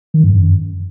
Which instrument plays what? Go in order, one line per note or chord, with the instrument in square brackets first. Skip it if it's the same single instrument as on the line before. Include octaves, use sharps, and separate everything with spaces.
[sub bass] D#3
G2
F#2